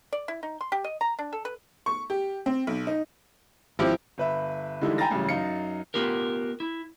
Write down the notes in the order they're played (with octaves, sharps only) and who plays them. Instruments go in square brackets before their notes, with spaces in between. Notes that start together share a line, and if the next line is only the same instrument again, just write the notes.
[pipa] D5
E4
D#4
C6
G4
D#5
A#5
D4
A4
B4
[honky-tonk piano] C#6
G4
C4
B1
D#4
[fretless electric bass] G#1 C#3 C4 [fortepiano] F3 E4 G4
[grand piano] G1 B4 E5
D3 E3 G3 G#3 D#4 E4
G5 G#5 A#5 B5 A6 A#6
A1 G2 C#3 E3 F#3
F#2 D#4 F5 C#7
[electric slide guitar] B3 F4 G4 A#4
E4